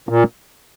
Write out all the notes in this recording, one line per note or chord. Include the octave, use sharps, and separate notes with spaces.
A#2